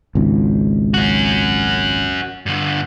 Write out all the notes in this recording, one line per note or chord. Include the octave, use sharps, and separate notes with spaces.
G#1 C#2
C#4 F#4
G2 D3